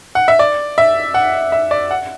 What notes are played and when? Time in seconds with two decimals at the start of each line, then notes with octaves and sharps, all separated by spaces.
0.15 F#5
0.28 E5
0.39 D5
0.78 E5
1.14 F#5
1.52 E5
1.71 D5
1.91 F#5